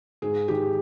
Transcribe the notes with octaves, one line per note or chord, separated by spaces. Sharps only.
G#2 G#4
D#3 G4